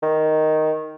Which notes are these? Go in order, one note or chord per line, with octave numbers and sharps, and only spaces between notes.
D#3